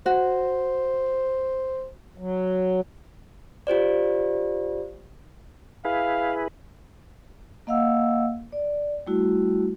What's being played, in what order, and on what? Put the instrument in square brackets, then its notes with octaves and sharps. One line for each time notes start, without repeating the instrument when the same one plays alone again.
[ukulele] F#4 [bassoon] C5
[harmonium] F#3
[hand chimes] F4 G4 C5 D5
[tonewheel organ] E4 G#4 B4 [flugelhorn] F5
[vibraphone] A#3 D#5 F5 F#5 E6
D5
G3 A3 E4 F#4